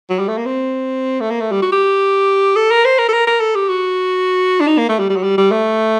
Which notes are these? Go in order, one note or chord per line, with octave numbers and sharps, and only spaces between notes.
F#3
G3
A3
A#3
C4
A3
A#3
A3
G3
F#4
G4
A4
A#4
C5
A#4
A4
A#4
A#4
A4
G4
F#4
D4
D#4
A#3
A3
G3
G3
F#3
G3
G3
A3